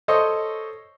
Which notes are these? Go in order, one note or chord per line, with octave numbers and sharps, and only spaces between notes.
A4 C5 C#5 D#5